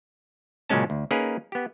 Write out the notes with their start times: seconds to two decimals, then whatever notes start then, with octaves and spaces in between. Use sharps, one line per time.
0.70 A#2 C#3 F#3 G#3 C#4 A5
0.90 D2
1.11 A#3 C#4 D#4 G#4 A#4 B4
1.52 B3 G4